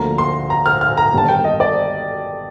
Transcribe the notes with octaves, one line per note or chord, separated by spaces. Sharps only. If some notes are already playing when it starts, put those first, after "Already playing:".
Already playing: D2 D3 F3 A#3 A#5
C6
A#5
F6
F6
A#5
G1 G2 D#3 A5
G5
D#5
D5